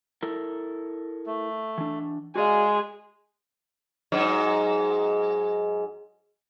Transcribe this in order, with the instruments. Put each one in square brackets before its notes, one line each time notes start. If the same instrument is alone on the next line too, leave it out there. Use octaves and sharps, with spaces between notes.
[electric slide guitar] E4 A4 A#4
[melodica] A3
[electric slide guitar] E3 D4
[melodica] G#3 [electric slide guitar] F#4 D5 F5 [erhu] G#4
[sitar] G#2 F#3 D#4